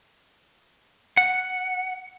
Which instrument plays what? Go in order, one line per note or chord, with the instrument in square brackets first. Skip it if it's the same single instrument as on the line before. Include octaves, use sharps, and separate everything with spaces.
[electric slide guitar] F#5